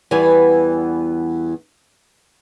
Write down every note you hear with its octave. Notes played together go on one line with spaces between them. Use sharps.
E2 E3 G3 B3 B4 G#5